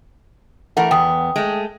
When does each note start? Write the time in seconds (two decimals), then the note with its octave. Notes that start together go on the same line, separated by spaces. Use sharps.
0.77 E3 A3 A#4 F#5
0.91 E2 B3 G5 D#6
1.36 G#3 A3